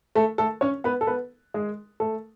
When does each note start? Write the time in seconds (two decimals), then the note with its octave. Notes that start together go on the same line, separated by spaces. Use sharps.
0.15 A3 A4
0.38 A3 A4
0.61 C#4 C#5
0.84 B3 B4
1.01 A4
1.07 B3 B4
1.54 G#3 G#4
2.00 A3 A4